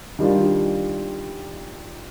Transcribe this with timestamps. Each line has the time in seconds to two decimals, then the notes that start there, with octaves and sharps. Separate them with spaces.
0.19 D#3 G3 D4 F4